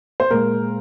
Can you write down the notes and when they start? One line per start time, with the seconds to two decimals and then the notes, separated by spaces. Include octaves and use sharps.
0.20 C5
0.31 A#2 G#3 A#4